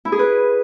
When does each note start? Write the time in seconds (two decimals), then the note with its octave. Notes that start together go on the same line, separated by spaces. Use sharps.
0.05 E4
0.12 G#4
0.19 B4